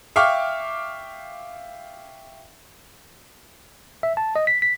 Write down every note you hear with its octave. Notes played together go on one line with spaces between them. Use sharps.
E5 F5 G5 C#6 D6 F6
E5
A5
D#5
B6
B6